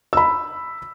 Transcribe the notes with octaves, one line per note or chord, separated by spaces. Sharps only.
B5 E6